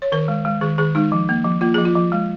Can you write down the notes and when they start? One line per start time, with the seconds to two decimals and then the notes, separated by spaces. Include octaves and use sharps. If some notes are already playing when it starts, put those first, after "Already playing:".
0.02 C#5
0.12 D#3 A#4
0.28 G#3
0.45 G#3
0.61 D#3 G#4
0.78 D#3 G#4
0.95 G#3 D#4
1.12 F3
1.29 A#3
1.45 F3
1.61 A#3 F4
1.74 F3 G#4
1.85 F4
1.95 F3
2.12 G#3